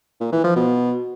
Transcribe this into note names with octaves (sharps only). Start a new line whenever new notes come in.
A#2
E3
F3
B2